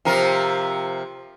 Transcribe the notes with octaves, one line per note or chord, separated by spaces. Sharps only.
C3 F3 A#4